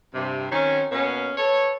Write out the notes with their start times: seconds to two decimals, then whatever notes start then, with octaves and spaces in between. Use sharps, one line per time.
0.15 G2 C3
0.52 D#3 F#3 C4 C#4
0.92 B2 A#3 C#4
1.37 A4 B4 C#5